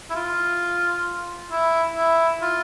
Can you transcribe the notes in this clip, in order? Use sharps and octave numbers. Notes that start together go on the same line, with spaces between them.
E4
F4
E4
E4
F4